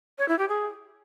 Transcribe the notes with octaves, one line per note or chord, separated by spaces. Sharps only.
C#5
E4
G4
G#4